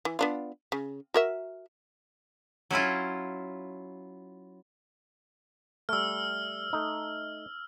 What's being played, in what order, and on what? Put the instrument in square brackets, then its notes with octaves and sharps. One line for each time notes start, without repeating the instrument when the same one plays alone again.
[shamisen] E3
B3 D4 F4
C#3
F#4 A#4 E5
[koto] F#3 C#4 E4 F4
[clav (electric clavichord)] G3 A3 [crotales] E6 F6
[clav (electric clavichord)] A3 D#4